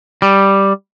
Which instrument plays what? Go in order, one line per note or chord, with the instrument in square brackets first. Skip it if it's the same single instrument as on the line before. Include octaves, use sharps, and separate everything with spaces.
[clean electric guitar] G3